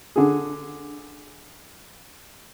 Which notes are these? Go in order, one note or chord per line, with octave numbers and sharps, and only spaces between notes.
D3 G#4